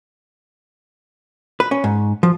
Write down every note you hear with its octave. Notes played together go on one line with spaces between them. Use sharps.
B4
C#4
G#2
F3